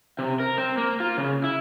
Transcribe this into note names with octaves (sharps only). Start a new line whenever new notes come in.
C3
A#4
C4
A#3
F4
C#3
E4